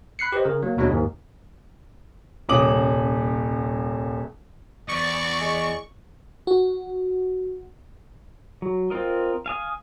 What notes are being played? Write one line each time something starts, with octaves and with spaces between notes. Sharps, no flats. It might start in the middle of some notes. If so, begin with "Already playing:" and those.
B5 F#6 C7 C#7
G4 B4 C5 D#5
C#3 A#4
F#3 A#3
D#2 B2 F#3 G#3 D4
D#2 G#2 D#3
D#1 C2 C#4 D6 D#6 F#7
E2 D5 C#6
G#3
F#4
F#3
C4 F4 A#4 D#5
F5 G#5 D#6